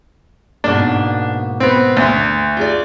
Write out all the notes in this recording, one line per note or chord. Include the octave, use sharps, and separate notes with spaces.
G#2 B2 A#3 D4
B3 C4
D2
F4 G#4 D5